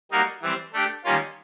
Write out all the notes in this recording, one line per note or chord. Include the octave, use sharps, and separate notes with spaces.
G3 A#3 D#4 F#4 A#4
E3 G3 C4
A3 D4 G4
D#3 G3 A#3 C#4 F4